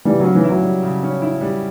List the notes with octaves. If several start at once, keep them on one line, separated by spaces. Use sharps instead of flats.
C#3 E3 G3
F#3 C#4
E3
E4
F#3
G3
C#3
C#4
E4
G3